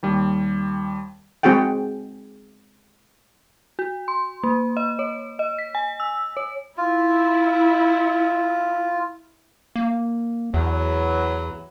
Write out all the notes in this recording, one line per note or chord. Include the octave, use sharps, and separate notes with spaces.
D#2 G3
G#3 C4 F#4 G#4 F#5 G5
F#4
C6
A#3
D#5
C#5
D#5
B6
G#5
E6
C#5
E4 F4
A#3
E2 E3 F#3